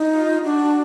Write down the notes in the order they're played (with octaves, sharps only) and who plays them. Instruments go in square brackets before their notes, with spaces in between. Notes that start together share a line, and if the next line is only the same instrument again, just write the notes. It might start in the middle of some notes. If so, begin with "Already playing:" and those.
Already playing: [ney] D#4
[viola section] F4
[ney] D4 [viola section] F#4